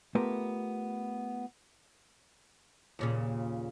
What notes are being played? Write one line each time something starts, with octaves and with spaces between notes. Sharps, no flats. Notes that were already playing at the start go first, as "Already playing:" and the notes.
A3 B3 F4 G4 A#4
D#2 A#2 C#3